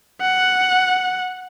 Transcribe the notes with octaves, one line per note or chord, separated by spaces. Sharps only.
F#5